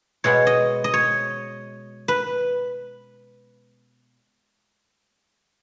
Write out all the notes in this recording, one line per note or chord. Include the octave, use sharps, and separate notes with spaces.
B2 G#3 B3 C#5
D#5
D#5
C#5
B4